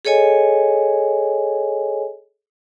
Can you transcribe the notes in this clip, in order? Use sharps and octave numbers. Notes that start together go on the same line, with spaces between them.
G#4 A4 C#5 D#5 G#5